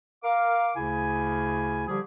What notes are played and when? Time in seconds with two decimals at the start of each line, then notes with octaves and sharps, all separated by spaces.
0.23 A#4 F5 D6
0.76 D2 C#3 E4 G#5
1.87 D3 F3 G3 G4 G#4